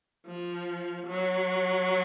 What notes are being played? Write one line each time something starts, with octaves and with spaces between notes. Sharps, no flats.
F3
F#3